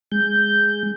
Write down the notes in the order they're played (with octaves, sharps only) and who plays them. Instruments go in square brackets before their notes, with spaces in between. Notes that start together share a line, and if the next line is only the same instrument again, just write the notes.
[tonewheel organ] G#3 G6